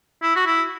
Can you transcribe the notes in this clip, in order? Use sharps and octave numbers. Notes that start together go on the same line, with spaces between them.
E4
F#4
E4